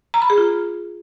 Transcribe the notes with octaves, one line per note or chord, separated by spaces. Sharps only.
A#5
B5
G#4
F4